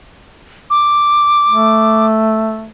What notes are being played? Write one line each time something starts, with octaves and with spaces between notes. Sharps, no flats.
D6
A3